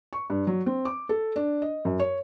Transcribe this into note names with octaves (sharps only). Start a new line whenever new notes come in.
C#6
G2
F#3
C4
D6
A4
D4
D#5
F#2
C#5